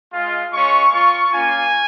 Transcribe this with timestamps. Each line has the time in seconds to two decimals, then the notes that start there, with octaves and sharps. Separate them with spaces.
0.12 G#3 F4
0.51 G#3 C#4 F4 C#6
0.92 A#3 F4 C#6
1.32 A#3 C#4 F4 G#5